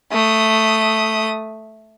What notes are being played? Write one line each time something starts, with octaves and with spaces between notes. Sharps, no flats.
A3 D#6